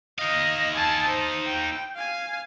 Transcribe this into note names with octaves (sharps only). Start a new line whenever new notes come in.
D#4 D#5 F5
G#5 A5
C5
G5
F5 G#5